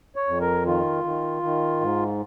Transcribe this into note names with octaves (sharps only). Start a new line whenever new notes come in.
C#5
F2
A#4
D#3 F4
D#3
D#3
G#2